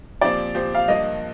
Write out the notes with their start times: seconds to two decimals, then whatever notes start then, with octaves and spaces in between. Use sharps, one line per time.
0.21 A#2 F3 C4 G4 C5 D5
0.55 A#2 F3 C4 G4 C5
0.75 F5
0.88 G2 F3 A#3 D#5